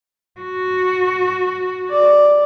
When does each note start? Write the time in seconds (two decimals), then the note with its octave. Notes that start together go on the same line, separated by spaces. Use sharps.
0.41 F#4
1.90 D5